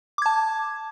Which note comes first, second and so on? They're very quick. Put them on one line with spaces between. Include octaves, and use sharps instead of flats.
D6 G#6 A5